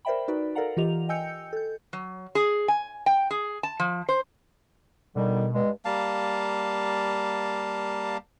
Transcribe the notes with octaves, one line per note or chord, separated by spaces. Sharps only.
A#4 C5 D5 E5 G5 B5
D#4 F#4 B4 D5
A4 A#4 D5 F5 F#5 A#5
E3 F4 G4 D#5 F7
D#5 G5 G#5 E6 G6 C#7
A4 G6
F#3
G#4
G#5
G5
G#4
A5
F3
C5
B2 D3 D#3 G3
G2 G#3
G3 A#3 F5 A5